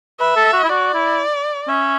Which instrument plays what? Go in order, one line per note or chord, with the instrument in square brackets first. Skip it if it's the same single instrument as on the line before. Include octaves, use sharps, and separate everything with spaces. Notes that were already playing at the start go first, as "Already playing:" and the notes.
[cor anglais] B4 [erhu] E5
[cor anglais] A4
F#4
E4
[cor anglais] F#4 [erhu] D5
[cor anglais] E4
[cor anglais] C#4 [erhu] E5